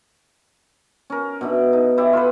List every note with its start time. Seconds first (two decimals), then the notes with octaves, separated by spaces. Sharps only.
1.10 C#4 A#4
1.41 B2 D4 E5
1.73 D#4
1.97 E4 G4 D5 E5
2.13 F4 A4 B4